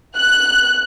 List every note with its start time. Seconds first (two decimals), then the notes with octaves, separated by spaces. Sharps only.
0.16 F#6